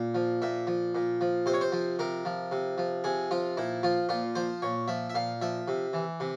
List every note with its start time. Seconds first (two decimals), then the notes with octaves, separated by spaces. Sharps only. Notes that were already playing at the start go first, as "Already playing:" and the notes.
Already playing: A#2
0.15 F3
0.42 A#2 E5
0.67 F3
0.95 A#2
1.21 F3
1.46 C3 C5
1.54 C#5
1.61 C5
1.72 F3
1.99 C3 A#4
2.25 F3
2.51 C3
2.78 F3
3.04 C3 G#4
3.31 F3 F4
3.57 A#2 E4
3.83 F3 F4
4.09 A#2 F4
4.35 F3 C5
4.62 A#2 C#5
4.88 F3 E5
5.09 E5
5.15 A#2 F5
5.42 F3 E5
5.68 C3
5.93 E3
6.20 C3